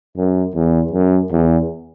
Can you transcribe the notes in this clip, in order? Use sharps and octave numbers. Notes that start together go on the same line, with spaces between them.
F#2
E2
F#2
E2